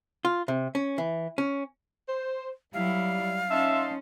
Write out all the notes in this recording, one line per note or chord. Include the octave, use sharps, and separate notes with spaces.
F4
C3
C#4
E3
C#4
C5
F#3 G3 E4 F5
C#4 D#4 E5 A5 C6